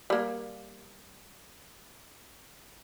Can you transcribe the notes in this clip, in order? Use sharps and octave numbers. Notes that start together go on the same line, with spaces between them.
G3 A#3